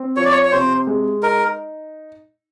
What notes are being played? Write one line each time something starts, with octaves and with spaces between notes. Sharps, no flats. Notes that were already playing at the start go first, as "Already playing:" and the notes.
Already playing: C4
F3 C#5
D5
C#5
C#5
C3 C5
G#3
D#4 A#4